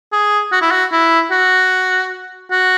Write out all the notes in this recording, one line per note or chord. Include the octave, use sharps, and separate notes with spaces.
G#4
F#4
E4
F#4
E4
F#4
F#4